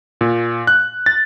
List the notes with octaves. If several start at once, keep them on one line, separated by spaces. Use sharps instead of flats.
A#2
F#6
A6